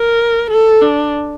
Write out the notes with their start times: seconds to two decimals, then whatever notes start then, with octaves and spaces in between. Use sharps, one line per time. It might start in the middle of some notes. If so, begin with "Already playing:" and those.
Already playing: A#4
0.51 A4
0.81 D4